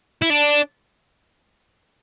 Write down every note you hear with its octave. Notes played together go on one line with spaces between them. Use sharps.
E4
D4